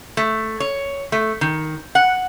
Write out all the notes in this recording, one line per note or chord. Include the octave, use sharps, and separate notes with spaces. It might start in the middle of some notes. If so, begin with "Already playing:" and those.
A3
C#5
A3
D#3
F#5